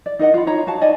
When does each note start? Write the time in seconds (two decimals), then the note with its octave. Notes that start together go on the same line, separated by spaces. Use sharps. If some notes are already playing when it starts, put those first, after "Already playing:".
0.06 D5
0.19 D#4 A#4 D#5 F#5
0.34 F4 B5
0.47 D#4 C#5 A#5
0.67 F#4 F5 A5
0.81 D#4 D5 D#5 G#5